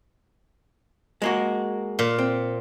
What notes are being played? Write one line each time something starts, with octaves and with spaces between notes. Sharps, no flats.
G#3 A#3 F#4
A#2
C4